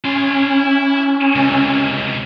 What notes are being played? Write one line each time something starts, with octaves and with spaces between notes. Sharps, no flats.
C#4 E4 C6
C#2 C3